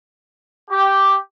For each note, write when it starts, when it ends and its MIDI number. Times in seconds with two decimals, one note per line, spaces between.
0.70 1.14 67